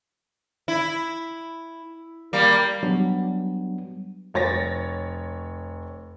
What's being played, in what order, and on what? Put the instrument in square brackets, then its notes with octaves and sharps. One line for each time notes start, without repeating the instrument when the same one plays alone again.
[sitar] E4
G3 A#3
[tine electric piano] F#3 G3 B3 D4
[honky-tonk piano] F1 C#5 A6 A#6